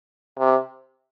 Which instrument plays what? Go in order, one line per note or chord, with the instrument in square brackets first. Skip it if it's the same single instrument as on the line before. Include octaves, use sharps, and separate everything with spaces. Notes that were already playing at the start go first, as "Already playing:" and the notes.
[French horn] C3